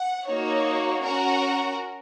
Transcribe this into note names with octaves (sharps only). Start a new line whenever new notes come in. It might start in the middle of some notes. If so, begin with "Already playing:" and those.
Already playing: F#5
A#3 D#4 F#4 C#5
C#4 F#4 A#4 F#5